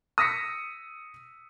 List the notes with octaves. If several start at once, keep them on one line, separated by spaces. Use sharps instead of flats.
D#6 E6 A#6 B6 C#7